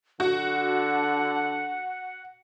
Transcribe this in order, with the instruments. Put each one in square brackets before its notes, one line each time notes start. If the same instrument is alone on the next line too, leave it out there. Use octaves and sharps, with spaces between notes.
[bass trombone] D3 [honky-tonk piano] F#4 [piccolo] F#5